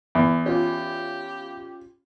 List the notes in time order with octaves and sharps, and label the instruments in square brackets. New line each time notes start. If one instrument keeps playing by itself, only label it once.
[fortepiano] E2
[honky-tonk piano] C#4 F4 [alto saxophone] G4